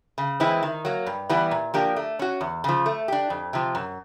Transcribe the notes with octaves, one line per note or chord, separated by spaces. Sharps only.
C#3
E3 G#3 C4 E4
D#3
F#3 A#3
G2
E3 G3 B3 E4
A#2
F3 A#3 D4 G4
A3
C#4 F#4
E2
C#3 F3
A3
D4 G4
F2
C3 F3
F#2